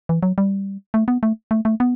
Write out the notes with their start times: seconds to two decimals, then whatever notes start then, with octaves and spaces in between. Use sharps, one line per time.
0.09 E3
0.23 F#3
0.38 G3
0.94 A3
1.08 B3
1.23 A3
1.51 A3
1.65 A3
1.80 B3